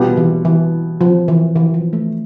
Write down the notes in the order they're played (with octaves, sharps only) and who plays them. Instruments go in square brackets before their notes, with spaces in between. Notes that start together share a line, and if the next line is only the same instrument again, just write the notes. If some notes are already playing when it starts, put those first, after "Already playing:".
Already playing: [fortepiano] B2 G3 B3 F4
[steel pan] E3
E3
F3
E3
E3
F3
A3